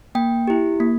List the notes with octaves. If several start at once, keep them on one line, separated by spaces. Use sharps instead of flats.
A#3 G5
E4 G4
A#3